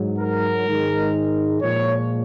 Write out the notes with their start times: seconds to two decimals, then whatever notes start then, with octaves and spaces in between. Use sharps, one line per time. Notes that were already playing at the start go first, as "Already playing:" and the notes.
Already playing: G#2 F#3
0.19 A#4
0.66 G#2 D#3 G#3
1.61 A#2 F3 G#3 C#5